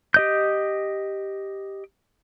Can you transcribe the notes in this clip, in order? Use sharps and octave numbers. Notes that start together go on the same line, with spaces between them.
G4 D#5 G6